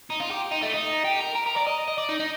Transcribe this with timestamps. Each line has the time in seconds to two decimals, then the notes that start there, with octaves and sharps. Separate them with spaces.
0.10 D#4
0.20 F4
0.31 G4
0.51 D#4
0.62 A3
0.73 D#4
1.05 G4
1.21 A#4
1.35 A#4
1.47 A#4
1.57 D5
1.67 D#5
1.88 D#5
1.98 D5
2.09 D#4
2.20 D#4